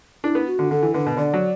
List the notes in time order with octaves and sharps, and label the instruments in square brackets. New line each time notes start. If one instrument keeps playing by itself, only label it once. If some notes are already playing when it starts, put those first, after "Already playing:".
[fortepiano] D4 [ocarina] E4
[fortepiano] B3
[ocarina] F#4
[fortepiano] D3
[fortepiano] D3 [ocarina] A4
[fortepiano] E3
[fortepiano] D3 [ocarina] B4
[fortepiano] B2
[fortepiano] D3 [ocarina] D5
[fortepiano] F#3